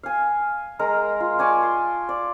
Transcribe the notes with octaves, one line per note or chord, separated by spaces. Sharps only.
F5 G#5
G#3 A#4 A#5
F4
D5 G#5 A5 C#6
C6
D5